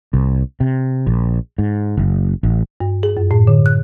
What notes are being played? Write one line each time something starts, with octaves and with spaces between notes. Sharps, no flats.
C2
C3
A#1
G#2
F#1
A1
G2
G#4
F#2
A2
D3
F#6